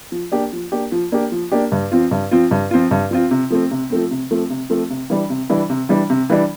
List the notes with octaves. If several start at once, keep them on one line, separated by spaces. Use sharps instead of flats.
F3
A#3 D4 G4
F3
A#3 D4 G4
F3
A#3 D4 G4
F3
A#3 D4 G4
G2
F3 C4 F4
G2
F3 C4 F4
G2
F3 C4 F4
G2
F3 C4 F4
C3
F3 A3 C4
C3
F3 A3 C4
C3
F3 A3 C4
C3
F3 A3 C4
C3
E3 G3 D4
C3
E3 G3 D4
C3
E3 G3 D4
C3
E3 G3 D4